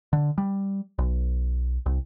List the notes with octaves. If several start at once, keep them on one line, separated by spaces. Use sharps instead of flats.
D3
G3
B1
C2